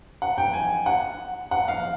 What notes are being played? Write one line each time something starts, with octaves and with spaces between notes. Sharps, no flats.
F#5
G5
G#5
F#5
F#5
F5